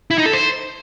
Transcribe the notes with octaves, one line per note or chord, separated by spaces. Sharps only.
E4
D#4
A4
C5